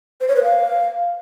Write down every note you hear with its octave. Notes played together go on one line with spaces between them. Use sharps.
C5
C#5
B4
F5